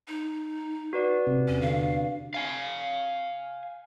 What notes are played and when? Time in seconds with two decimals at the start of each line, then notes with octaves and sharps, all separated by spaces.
0.08 D#4
0.93 F#4 B4 D5
1.27 D1 C3
1.48 E2 C#4
1.62 D3 F5
2.34 F5 G#5